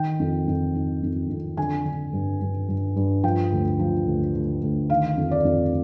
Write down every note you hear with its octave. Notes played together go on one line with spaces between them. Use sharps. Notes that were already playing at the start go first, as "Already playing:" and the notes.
Already playing: D#3 G5
F2
F2
D#3
F2
F2
D3 G#5
D3
G2
G2
G2
G2
F3 G5
D2
F3
D2
D2
D2
D#3 F5
F2
D5
F2